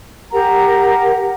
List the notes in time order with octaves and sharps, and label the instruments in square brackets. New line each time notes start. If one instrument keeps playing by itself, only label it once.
[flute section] G4 A#4 F#5 A#5